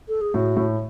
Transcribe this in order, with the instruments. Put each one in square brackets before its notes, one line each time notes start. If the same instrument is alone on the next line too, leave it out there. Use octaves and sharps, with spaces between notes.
[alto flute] A4
G#4
[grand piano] A2 [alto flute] F#4
[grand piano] A2